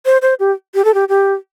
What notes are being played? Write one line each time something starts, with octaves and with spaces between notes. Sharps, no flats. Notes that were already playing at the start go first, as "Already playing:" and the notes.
C5
C5
G4
G4
A4
G4
G4